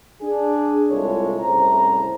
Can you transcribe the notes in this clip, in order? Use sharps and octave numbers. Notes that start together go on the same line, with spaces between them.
D4 G#4
C2 G#3 E4 F4 A4 C#5
C2 A2 C#3 C5 A#5